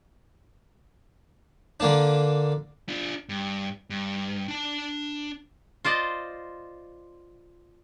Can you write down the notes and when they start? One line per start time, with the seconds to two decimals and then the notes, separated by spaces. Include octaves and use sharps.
1.80 D3 A#3 D4
2.89 D4 F4
3.29 G2
3.90 G2
4.48 D4 A5
5.85 F4 C5 D5 D#5